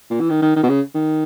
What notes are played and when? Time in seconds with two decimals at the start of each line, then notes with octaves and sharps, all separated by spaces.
0.10 A#2
0.20 E3
0.30 D#3
0.42 D#3
0.56 D#3
0.63 B2
0.69 C#3
0.95 D#3